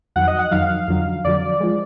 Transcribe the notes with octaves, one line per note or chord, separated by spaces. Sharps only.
F2 D#3 F#3 F#5
D#5
F#5
F2 D#3 F#3 F5
F2 D3 F#3
F2 D3 F#3 D5
F3 G#3